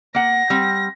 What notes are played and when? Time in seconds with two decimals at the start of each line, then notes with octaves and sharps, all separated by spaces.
0.15 A#3 F#5 A#6
0.50 G3 C4